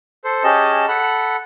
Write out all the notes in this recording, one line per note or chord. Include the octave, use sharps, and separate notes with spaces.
A4 C5
C#4 G4 G#4 D#5 A5
A4 F#5 B5